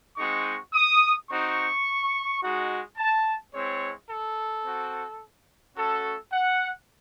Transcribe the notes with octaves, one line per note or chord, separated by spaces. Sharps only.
G#3 C4 D#4 F#4 C#6
D#6
C4 D#4 F#4 C#6
G#3 D#4 F#4
A5
G#3 C4 E4 C#5
A4
C4 F#4
A3 C#4 F#4 A4
F#5